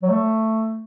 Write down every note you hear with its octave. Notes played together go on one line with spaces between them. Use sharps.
F#3
A3